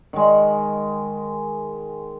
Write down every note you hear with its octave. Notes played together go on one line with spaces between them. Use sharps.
D#3 G#3